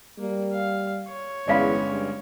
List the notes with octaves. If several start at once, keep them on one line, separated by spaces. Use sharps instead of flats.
G3 A#3
F5
C#5
G1 E2 G#3 C#4 D5 F5 B5
G2